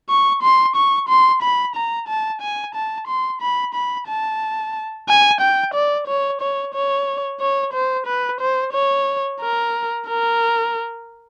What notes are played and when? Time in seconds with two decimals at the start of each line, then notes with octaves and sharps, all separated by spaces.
0.10 C#6
0.43 C6
0.76 C#6
1.09 C6
1.42 B5
1.76 A#5
2.08 A5
2.41 G#5
2.75 A5
3.08 C6
3.41 B5
3.74 B5
4.08 A5
5.08 G#5
5.41 G5
5.74 D5
6.07 C#5
6.41 C#5
6.74 C#5
7.41 C#5
7.74 C5
8.07 B4
8.41 C5
8.73 C#5
9.41 A#4
10.07 A#4